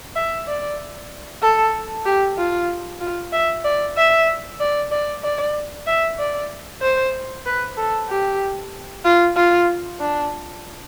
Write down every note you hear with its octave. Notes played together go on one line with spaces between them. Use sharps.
E5
D5
A4
G4
F4
F4
E5
D5
E5
D5
D5
D5
E5
D5
C5
B4
A4
G4
F4
F4
D4